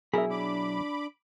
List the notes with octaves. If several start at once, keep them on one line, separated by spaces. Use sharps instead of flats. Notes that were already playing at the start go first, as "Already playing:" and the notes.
B2 F#3 D4 E4 G#4 A#4 E5 B5
D4 B5 D6